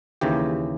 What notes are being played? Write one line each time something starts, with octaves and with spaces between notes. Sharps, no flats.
D#2 C#3 E3 G4